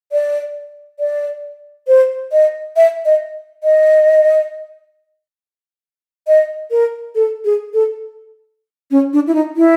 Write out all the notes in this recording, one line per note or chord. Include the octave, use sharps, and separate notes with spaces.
D5
D5
C5
D#5
E5
D#5
D#5
D#5
A#4
A4
G#4
A4
C#4
D4
E4
D#4
E4